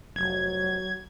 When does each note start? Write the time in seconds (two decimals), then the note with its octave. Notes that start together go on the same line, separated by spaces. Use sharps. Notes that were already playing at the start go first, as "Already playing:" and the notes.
0.16 F1 F#3 G#6